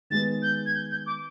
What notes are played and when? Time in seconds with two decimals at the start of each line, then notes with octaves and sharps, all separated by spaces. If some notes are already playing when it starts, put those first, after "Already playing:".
0.10 D#3 G#3 B3 A6
0.42 G6
0.66 G#6
0.75 G6
0.91 G6
1.07 D6